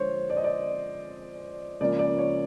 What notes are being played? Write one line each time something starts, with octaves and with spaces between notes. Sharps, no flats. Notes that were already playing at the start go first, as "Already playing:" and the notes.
Already playing: D3 F3 G#3 C5 C#5
D5
D#5
D5
C#2 C#3 F3 A#3 D5
D5
C#5